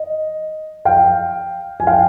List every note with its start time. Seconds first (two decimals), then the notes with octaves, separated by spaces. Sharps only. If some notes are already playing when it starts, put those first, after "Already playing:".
Already playing: D#5
0.85 F5 G5
1.80 G#5
1.87 F5 G5